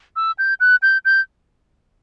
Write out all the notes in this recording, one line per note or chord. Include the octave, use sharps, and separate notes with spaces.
E6
G6
F#6
G6
G6